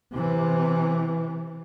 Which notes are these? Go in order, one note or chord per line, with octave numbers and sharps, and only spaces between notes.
C3 E3